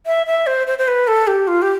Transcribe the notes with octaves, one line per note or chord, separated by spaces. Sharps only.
E5
E5
C5
C5
C5
B4
A4
G4
F4
G4